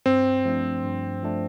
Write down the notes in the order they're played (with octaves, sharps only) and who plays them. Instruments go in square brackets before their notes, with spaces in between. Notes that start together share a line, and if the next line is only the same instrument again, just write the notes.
[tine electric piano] G2 [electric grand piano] C4
[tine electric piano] F3 A3 D4
G2
F3 A3 D4